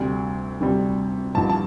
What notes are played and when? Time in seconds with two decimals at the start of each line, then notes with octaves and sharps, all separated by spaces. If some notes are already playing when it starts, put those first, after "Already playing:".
Already playing: D2 C3 G3
0.60 D2 C3 G3
1.35 A1 G2 F3 A5
1.49 A5